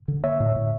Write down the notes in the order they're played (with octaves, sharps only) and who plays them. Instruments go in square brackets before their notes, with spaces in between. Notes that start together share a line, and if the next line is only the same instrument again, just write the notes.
[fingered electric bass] D3
[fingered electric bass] A#3 [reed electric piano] C#5 E5
[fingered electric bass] A2
A2